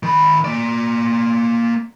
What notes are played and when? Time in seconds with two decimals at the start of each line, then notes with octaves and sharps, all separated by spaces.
0.03 D#3 B5
0.45 A#3 D5